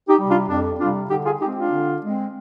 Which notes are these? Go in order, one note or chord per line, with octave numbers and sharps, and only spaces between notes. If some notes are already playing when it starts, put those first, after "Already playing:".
D#4 G4
C3 G3
D4 F4
F2 D4
C3 G3 D4 F4
D3 D#4 G4
F4 G#4
G#3 C4 D#4 G4
D4 F4
D3
G#3 C4